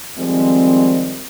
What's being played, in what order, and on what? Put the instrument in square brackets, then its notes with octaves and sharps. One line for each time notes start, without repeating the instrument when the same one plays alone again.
[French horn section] D#3 F3 G3 G#3 C4